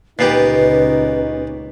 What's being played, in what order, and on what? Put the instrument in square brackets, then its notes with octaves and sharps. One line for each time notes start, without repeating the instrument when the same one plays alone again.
[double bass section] C#2 C#4 [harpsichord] A#2 B3 G4 [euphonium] D#4 [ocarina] B4